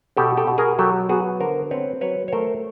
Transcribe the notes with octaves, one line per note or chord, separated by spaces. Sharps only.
B2 G4 A4
G4 A4
B2
G#4 A#4
F#3 G4 A4
B3 F#4 G#4
D3 A#4 C5
C4 B4 C#5
F#3 B4 C#5
C#5
A3 A#4 C5